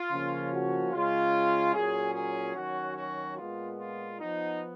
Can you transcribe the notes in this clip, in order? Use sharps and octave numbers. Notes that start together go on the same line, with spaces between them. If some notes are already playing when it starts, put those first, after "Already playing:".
Already playing: F4
C#3 F3 A#3 C#4
F#4
C#3 G#3 C#4 F4
A#2 F#3 C#4 G#4
G#4
D#3 F#3 C#4 F#4
F#4
A#2 G#3 B3 F4
F4
F3 B3 D#4